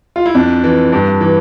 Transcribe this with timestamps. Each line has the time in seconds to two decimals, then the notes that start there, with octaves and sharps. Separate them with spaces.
0.16 F4
0.26 E4
0.35 F2 D4
0.64 E3
0.92 G2
1.21 E3